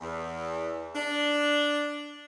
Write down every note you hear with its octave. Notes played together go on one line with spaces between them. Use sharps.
E2
D4